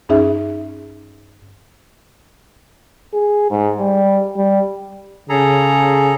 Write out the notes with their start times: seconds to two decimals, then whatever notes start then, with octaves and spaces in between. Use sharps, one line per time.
0.09 G2 C#4 D#4 G#4 E5
3.13 G#4
3.50 G#2
3.79 G3
4.36 G3
5.29 C#3 G#4 A4 A#5